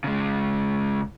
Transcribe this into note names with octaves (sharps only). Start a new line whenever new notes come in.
C#3 G#3